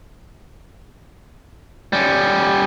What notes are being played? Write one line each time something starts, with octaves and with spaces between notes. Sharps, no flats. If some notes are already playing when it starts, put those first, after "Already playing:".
G3 C#4